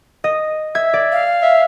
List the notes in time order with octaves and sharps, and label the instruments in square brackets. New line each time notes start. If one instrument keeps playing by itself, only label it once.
[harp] D#5
[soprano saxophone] E5 [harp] G#6
[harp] D5
[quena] F5
[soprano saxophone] E5